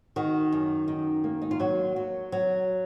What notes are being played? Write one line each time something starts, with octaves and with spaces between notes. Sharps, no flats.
D#3 F#4
F#2
D#3
A#3
D#4
F4
F#3 F#4
F#3
F#3